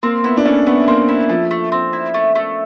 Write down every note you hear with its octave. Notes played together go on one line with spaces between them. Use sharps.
A#3 C4
B3 E4
D4
A3 C#4
A3 B3
A#3 C4
E4
F3 A3
A3
C4
E4
A3
A3